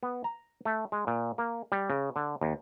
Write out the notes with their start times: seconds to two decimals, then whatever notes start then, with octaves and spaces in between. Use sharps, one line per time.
0.03 B3
0.24 A#5
0.65 A3
0.92 G#3
1.07 A#2
1.38 A#3
1.72 G3
1.90 C#3
2.16 D3
2.41 D#2